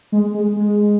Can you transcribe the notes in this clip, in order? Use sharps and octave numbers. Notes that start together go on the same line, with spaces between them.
G#3
G#3
G#3